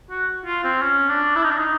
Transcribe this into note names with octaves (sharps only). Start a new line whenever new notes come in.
F#4
F4
C4
C#4
D4
E4
D#4
D4
D#4